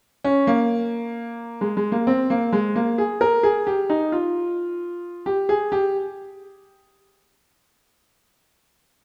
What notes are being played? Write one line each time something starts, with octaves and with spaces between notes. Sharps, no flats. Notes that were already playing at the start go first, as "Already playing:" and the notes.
C#4
A#3
G#3
G#3
A#3
C4
A#3
G#3
A#3
G#4
A#4
G#4
G4
D#4
F4
G4
G#4
G4